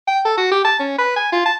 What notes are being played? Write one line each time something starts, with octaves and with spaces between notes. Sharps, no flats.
G5
A4
F#4
G4
A5
C#4
B4
G#5
F4
A5